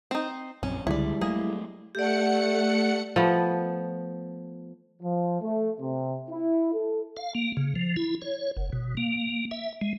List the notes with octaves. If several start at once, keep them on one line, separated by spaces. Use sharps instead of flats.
C4 D#4
A#1 F#2 C4 C#4
C#2 D3 G3 G#3 E4 C#5 D5
F#3 A3 A#3 G#4
A3 G4 D5 F#5 C#7
F3 A3 B3
F3
A3
C3
E4
A4
F5
A#3
C#3
F3
E4
C#5
F#1
B2
A#3
E5
G#3